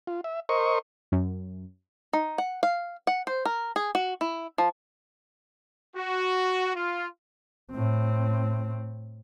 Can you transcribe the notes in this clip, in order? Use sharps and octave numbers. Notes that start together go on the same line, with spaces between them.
F4
E5
A#4 C5 D#5 C#6
F#2
D#4
F#5
F5
F#5
C5
A#4
G#4
F#4
E4
F3
F#4
F4
A2 C4